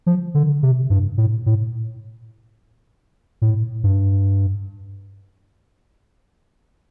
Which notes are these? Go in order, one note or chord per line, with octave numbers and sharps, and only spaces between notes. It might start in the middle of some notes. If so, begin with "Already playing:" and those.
F3
D3
C3
G2
A2
A2
A2
G2